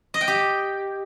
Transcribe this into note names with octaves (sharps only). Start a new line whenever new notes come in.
D#5
G5
G4